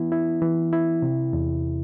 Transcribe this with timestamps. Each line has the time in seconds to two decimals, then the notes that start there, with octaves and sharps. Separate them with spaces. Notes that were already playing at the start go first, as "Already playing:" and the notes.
Already playing: E3 B3 E4
0.12 E4
0.42 E3
0.73 E4
1.02 C3
1.33 E2